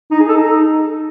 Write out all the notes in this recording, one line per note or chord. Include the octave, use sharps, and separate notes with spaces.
D#4
G#4
A4
D#4